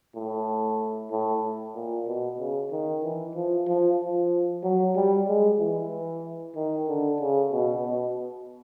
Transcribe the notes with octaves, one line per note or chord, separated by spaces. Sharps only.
A2
A2
A#2
B2
C#3
D#3
E3
F3
F3
F3
F#3
G3
G#3
E3
D#3
D3
C#3
B2
B2